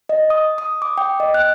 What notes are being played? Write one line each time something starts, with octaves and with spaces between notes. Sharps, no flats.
D#5
D#6
D#6
D6
G5
D#5
F#6